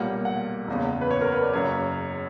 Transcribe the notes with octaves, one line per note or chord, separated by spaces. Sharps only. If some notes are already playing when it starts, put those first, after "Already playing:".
Already playing: B1 A#2 G3 A#3 F#5
F#5
F#1 E2 C#3
B4
C#5
A#4
B4
D5
F#1 F#2 C#3 C#5